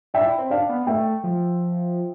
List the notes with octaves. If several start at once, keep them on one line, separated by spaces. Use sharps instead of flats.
D4 E5 G5
E4
C4
D4 D5 F5
B3
B3
A3 E5 G5
F3